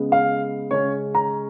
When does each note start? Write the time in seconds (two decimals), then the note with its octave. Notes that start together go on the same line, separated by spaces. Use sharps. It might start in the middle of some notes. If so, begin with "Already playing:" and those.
Already playing: C#3 G#3 B3
0.12 F5
0.71 C#3 G#3 C#4 C#5
1.15 A#5